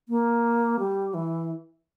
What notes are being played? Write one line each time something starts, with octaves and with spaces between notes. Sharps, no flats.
A#3
G3
E3